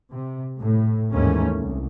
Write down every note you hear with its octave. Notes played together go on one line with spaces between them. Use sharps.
C3
A2
D#2 G#2 E3 A3 A#3 C#4
C2